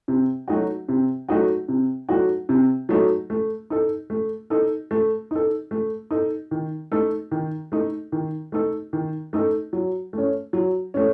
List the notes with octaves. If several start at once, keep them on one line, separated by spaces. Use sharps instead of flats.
C3
F#3 A3 D#4 F#4
C3
F#3 A3 D#4 F#4
C3
F#3 A3 D#4 F#4
C3
F#3 A3 D#4 F#4
A3
D#4 A4
A3
D#4 A4
A3
D#4 A4
A3
D#4 A4
D#3
A3 D#4 A4
D#3
A3 D#4 A4
D#3
A3 D#4 A4
D#3
A3 D#4 A4
F#3
A3 C#4
F#3
A3 C#4